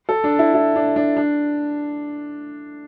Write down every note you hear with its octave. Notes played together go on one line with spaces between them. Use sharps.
A4
D4
E4
E4
D4
D4
D4